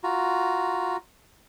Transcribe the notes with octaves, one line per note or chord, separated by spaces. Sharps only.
F4 F#4 A#5